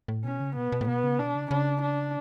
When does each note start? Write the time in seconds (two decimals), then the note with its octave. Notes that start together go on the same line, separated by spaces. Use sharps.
0.08 A2
0.25 B2 C#4
0.40 C#3
0.56 B2 B3
0.72 B2
0.81 A2
0.87 B2 B3
1.04 C#3
1.19 B2 D4
1.35 C#3
1.51 C#3 D4
1.82 D4